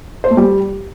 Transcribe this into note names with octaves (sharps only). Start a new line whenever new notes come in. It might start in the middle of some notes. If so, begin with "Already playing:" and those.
C5
A3
G3